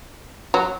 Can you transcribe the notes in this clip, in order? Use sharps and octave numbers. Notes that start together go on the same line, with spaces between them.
F#3